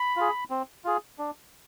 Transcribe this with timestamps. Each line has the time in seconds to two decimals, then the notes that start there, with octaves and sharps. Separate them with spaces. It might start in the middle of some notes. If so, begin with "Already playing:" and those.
Already playing: B5
0.17 F4 G#4
0.50 C4
0.85 F4 G#4
1.19 D4